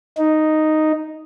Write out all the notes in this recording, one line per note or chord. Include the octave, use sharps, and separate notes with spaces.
D#4